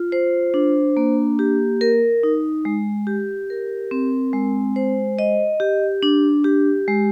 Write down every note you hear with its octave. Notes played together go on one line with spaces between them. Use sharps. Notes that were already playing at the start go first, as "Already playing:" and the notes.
Already playing: F4
C5
D4
A#3
G4
A#4
D#4
G#3
G4
A#4
C4
G#3
C5
D#5
G4
D4
G4
G#3